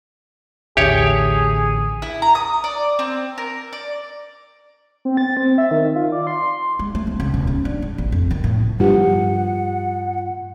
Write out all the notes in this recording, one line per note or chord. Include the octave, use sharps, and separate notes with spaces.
A1 D#2 D3 G4 G#4 C#5
E4
A#5
D#6
D5
C4
A#4
D5
C4
A6
C4
E5
D#3
F4
D5
C6
G#3
A3
C4
C#2
D#1
C#4
D4
G#2
A1
F2
D#3
A2
G2 F3 G4 F#5